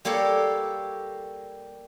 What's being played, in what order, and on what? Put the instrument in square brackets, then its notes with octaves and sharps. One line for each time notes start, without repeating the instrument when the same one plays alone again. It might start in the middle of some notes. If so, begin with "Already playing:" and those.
[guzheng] G3 A#3 G4 A4 C#5